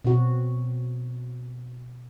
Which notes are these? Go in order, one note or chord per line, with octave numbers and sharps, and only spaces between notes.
B2 C4 F#4